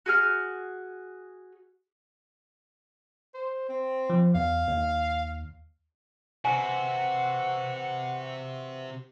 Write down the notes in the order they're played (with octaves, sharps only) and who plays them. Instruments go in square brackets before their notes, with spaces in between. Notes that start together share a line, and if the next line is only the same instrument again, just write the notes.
[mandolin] F#4 G#4 F6
[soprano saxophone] C5
C4
[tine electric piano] F3
[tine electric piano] E2 [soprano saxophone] F5
[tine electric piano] D#2
[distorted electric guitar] C3 [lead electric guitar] E3 F#4 [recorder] F#5 [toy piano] G#5 A#5